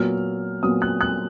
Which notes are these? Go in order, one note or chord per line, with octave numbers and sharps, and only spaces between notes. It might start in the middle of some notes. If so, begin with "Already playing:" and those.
Already playing: A#2 F#3 B3 F6
A#2 F#3 B3 D#6
F#6
F#6